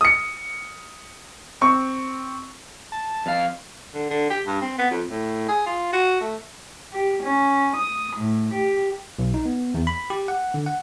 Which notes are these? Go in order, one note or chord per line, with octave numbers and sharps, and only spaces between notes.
D#6 C#7
C4 C#6
A5
F2 F5
D3
D3
G4
G2
C4
B3
F2
A2
G#4
F4
F#4
A3
G4
C#4
D#6
A2
G4
B1
D#4
B3
E2
B5
G4
F#5
D3
F#5